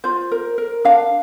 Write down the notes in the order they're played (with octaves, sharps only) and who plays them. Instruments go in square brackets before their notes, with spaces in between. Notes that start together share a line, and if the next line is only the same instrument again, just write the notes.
[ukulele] F4 C5
A#4
A#4
D4 F5